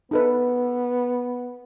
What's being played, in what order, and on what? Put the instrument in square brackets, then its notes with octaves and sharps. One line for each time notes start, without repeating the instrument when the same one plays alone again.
[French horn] B3 [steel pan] D#4 A4 B4